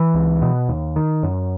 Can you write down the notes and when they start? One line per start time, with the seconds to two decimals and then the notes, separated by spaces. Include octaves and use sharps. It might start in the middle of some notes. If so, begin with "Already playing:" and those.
Already playing: E3
0.14 C#2
0.42 B2
0.69 D#2
0.96 D#3
1.23 F#2